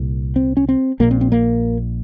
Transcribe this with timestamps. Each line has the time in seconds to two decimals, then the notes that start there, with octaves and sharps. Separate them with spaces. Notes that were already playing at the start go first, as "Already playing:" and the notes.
Already playing: C2 A#2
0.36 C4
0.57 C#4
0.69 C4
1.00 A#1 A#3
1.03 A#2
1.11 C4
1.21 C4
1.32 A#3